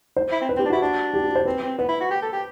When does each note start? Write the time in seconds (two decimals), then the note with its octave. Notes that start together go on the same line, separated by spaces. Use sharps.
0.16 C5
0.32 E4
0.41 C4
0.49 B4
0.56 C4
0.59 G4
0.65 D4
0.70 E4 F#4
0.81 D4
1.14 G4
1.24 F#4
1.35 C5
1.45 C4 B4
1.63 C4
1.78 B3 B4
1.89 E4
2.01 F#4
2.11 G4
2.22 A4
2.33 G4